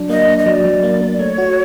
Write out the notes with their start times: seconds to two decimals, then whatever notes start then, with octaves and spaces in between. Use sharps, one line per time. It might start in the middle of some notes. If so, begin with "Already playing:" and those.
Already playing: F#3 D4
0.09 A#3 D#5
0.28 D4
0.39 D#5
0.46 F#3 D5
0.65 F#3
0.83 A#3
1.01 A#3
1.19 A3 C#5
1.38 F#4